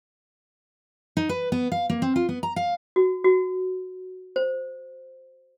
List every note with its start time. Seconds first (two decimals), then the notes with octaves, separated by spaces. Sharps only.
1.17 D#4
1.29 B4
1.52 B3
1.72 F5
1.90 A#3
2.02 C4
2.16 F4
2.29 B3
2.43 A#5
2.56 F5
2.96 F#4
3.24 F#4
4.36 C5